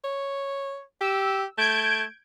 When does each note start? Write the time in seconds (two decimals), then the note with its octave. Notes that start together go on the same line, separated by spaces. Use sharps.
0.04 C#5
1.01 G4 E6
1.58 A3 G6 G#6 D7